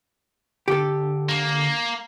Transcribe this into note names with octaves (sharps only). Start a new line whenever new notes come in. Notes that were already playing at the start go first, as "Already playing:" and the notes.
D3 G4 A4
A#3